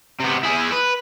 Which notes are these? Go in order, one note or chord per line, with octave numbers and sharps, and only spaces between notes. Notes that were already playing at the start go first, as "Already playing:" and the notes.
C3 B3
E4 G#4
B4